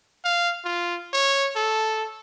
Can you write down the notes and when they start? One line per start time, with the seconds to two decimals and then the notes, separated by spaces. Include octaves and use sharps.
0.25 F5
0.65 F4
1.13 C#5
1.56 A4